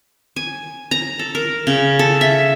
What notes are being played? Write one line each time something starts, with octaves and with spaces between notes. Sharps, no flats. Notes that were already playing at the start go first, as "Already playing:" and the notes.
G#5
A#5
A4
A#4
C#3
A4
E5